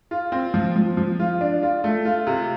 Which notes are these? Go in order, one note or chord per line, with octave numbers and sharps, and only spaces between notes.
F4
C4
F3
F3
F3
F4
D4
F4
A3
F4
C3